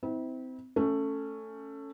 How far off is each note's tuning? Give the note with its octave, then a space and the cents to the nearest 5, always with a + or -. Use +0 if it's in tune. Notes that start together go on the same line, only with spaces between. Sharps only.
C4 -25 E4 -35
A3 +10 C#4 +0